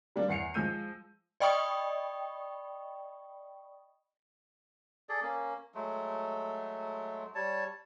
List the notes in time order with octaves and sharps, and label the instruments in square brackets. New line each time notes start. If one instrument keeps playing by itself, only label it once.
[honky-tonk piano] G3 A#3 D4
E2 F#5 C7 C#7 F7
F3 G#3 E6 G6 D#7
[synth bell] D5 D#5 G5 B5 C#6 D#6
[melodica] G#4 A4 D5
A#3 C#4
F#3 G#3 A3
G3 C#5 A5